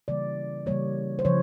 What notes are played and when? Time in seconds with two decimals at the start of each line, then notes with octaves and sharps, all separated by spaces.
0.08 C#3 E3 G3 A#3 D5
0.66 C#3 E3 G3 A#3 C#5
1.19 C5
1.25 C#3 F3 C#5